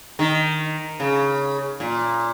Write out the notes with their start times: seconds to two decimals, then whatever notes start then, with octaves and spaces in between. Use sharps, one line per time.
0.19 D#3
1.00 C#3
1.80 A#2